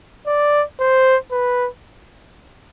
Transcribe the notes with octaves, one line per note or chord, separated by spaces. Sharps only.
D5
C5
B4